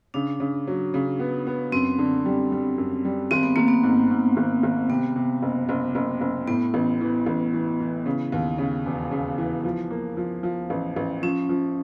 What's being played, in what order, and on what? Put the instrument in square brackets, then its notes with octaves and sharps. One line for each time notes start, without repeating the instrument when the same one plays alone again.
[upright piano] C#3 [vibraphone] D4
[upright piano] C#3
F#3
C#3
B3
B3
[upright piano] F#2 [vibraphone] C4
[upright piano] D3
G3
G3
F#2
G3
[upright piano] G#1 [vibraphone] C4
[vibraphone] B3
[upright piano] G#1 [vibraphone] A#3
[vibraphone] B3
[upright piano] G#2
G#2
G#1
G#1
[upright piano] C3 [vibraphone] B3
[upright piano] C3
F#1
F#1
F#1
F#1
[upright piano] A2 [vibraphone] B3
[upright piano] A1
E3
A1
E3
E3
C#3
D#2
C#3
E1
C#3
E3
F3
A#3
F3
F3
A1
A1
[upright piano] F3 [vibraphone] C#4
[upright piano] F3